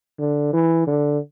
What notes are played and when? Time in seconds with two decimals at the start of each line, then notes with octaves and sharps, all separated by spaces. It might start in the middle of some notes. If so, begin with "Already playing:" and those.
0.19 D3
0.53 E3
0.87 D3